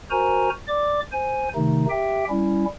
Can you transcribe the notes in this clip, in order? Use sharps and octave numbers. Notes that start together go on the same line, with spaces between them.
F#4 A#4 C5 G#5 A#5
D5 D6
C5 G#5
C3 D#3 A3 D#4
G4 E5 G5
G3 C#4 E4